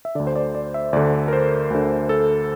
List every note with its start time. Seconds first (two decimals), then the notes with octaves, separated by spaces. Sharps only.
0.05 E5
0.15 D2 D3 D5
0.27 C5
0.35 D5
0.55 D5
0.74 E5
0.93 D2 D3 D5
1.28 A#4
1.33 C5
1.70 D2 D3
2.09 A4